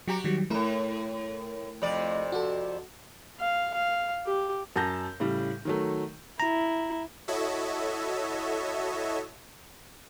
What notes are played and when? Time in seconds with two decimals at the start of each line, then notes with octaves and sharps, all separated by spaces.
0.08 F#3 F#4 G4 A#5
0.24 D#3 F#3 G3
0.50 F2 A2 A3 E4 A#4
1.82 F2 C3 D5
2.32 F#4 A4
3.40 F5
3.75 F5
4.27 G4
4.76 F#2 A5 G6 A#6
5.20 A2 C#3 G3
5.65 D#3 F#3 A3
6.40 E4 A#5
7.28 E4 F#4 A4 C#5 D#5 E5